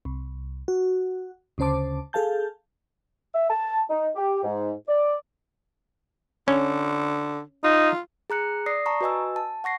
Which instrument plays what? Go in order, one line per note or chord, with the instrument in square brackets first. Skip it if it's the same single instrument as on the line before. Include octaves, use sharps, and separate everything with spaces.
[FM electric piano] C2
F#4
D2 C#3 C#4 C5 A5 D6
G#4 A4 F5 A5 G6
[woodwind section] E5
A5
D#4
G4
G#2
D5
[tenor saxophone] D3 [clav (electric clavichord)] C#4
[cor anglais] D#4 [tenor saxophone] F4
[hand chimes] G#4 A#5 F#6 C#7
D5 D#6 A#6 C7
A5 A#5 C#6
F#4 B4 D#5 G#5 E6
A5
F#5 C#6 A#6 C7